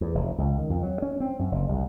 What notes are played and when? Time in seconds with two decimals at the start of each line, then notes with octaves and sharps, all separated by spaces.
0.01 E2
0.15 F1
0.38 C#2
0.58 D#3
0.70 F2
0.83 F#3
1.02 C#4
1.20 C4
1.39 F#2
1.52 F#1
1.69 C2